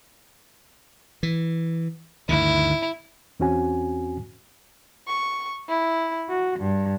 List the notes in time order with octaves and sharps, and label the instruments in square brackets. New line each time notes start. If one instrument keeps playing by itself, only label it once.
[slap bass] E3
[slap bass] D2 G2 D#3 [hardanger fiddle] E4
[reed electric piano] E2 C4 C#4 F#4 G#5
[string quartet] C#6
E4
F#4
G2